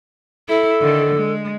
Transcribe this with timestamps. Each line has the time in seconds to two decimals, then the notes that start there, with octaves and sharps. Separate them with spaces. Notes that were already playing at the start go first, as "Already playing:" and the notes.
0.48 E4 A4
0.80 D3 D#3
1.15 G#3